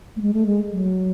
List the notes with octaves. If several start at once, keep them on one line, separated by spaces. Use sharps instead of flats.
A3
G#3
A3
G#3
F#3